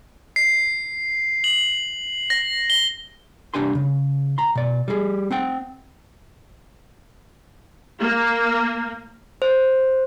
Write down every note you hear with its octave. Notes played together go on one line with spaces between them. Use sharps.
C7
F#7
A#6
G7
C2 F#3 D4 G4 G#5 C6
C#3
A#5 C6
B2 D5
G3 G#4
C4 F#5 G5
A#3
C5